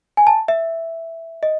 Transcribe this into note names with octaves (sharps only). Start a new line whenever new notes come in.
G#5
A5
E5
D#5